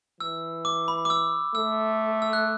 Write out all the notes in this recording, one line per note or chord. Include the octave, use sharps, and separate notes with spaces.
E3 E6
D6
B5
D6
E6
A3 E6
E6
F#6